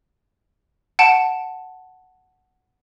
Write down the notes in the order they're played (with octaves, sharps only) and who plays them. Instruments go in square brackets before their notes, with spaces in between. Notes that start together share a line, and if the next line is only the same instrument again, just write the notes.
[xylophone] F#5 A5 D7 E7